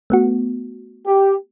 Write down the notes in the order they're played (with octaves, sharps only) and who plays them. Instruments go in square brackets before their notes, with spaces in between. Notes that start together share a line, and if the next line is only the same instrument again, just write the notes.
[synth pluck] A3 B3 F#4
[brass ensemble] G4